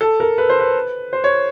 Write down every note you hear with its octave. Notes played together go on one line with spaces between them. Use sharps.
A4
A#4
B4
C5
B4
C5
C#5